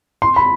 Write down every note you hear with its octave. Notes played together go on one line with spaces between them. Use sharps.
C6
B5